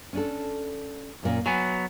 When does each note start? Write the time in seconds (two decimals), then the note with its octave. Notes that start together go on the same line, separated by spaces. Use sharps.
0.13 C#4 D4 A4
1.23 F#2 A#2 C#4
1.46 F#3 B3 G#5